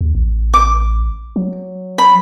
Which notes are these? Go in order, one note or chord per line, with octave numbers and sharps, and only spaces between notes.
D#2
A1
D6
F#3
B5